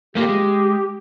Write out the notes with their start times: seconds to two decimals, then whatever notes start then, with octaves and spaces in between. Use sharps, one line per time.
0.15 A3 A#3 F4 G4
0.29 G#3